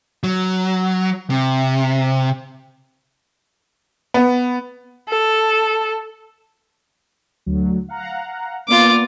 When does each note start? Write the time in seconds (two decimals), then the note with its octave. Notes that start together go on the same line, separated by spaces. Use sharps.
0.23 F#3
1.30 C3
4.14 B3
5.09 A4
7.46 D2 F#3
7.89 F5 F#5 A#5
8.68 A#3 B3 F4 D5 D6